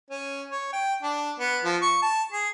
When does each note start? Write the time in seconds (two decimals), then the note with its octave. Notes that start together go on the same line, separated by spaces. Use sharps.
0.10 C#4
0.50 C#5
0.72 G5
1.02 D4
1.39 B3
1.64 F3
1.82 C#6
2.02 A5
2.32 G#4